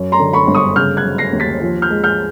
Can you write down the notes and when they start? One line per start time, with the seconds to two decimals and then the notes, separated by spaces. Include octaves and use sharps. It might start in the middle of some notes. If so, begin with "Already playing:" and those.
Already playing: F#2
0.12 A#5 C6
0.19 D3
0.33 B5 C#6
0.48 G1
0.55 C#6 D#6
0.76 C#3 F6 G6
0.97 F#6 G#6
1.04 F#3
1.18 A#6 C7
1.33 D#2
1.40 A6 B6
1.62 F3
1.82 F6 G6
1.90 G#3
2.04 F6 G6